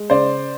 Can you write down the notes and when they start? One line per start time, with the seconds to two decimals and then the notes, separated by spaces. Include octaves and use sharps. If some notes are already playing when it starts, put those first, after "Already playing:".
Already playing: G#3
0.10 C#3 C5 D5